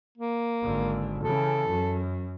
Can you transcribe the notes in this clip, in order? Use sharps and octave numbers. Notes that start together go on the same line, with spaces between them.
A#3
G#1 D3
C#3 E3 A4
F#2